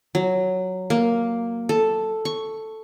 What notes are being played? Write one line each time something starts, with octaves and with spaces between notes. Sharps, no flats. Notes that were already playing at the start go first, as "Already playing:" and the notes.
F#3
A#3
A4
C#6